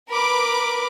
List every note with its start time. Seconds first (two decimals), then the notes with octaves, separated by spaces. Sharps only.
0.11 A#4 B4 B5 D6